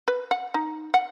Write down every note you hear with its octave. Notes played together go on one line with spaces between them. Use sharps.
B4
F#5
D#4
F#5